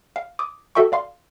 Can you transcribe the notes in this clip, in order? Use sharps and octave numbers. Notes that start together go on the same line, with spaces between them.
F5
D6 D#6
F#4 A4 E5 G5 C#6
D5 F5 C6